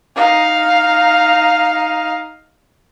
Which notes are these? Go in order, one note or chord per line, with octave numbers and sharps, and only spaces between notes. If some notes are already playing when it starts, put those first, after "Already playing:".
D#4 F5